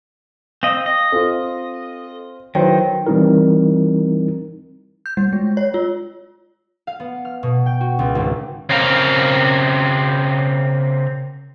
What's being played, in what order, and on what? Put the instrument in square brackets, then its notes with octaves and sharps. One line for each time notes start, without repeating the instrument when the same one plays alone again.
[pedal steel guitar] C4 D#5 [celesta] F5
[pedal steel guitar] D#5
[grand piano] C4 F4 [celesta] A4
[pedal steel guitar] D#3 [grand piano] F#3 E4 C5 [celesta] B4 G5
[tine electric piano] E3 G3 C4 D#4 E4 A#4
[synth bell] G6
G3
G#3
C#5
F4
[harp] F5
B3
F6
B2
G5
F#4
C#2
G#1
[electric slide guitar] C#3 C4 A#4 F5